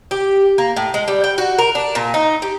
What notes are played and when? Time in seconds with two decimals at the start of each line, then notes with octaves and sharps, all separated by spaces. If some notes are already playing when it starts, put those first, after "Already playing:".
0.11 G4
0.58 A#3
0.76 A2
0.94 G#3
1.08 G3
1.24 G5
1.38 F#4
1.59 A#4
1.75 D4
1.95 A#2
2.14 D#4
2.42 G4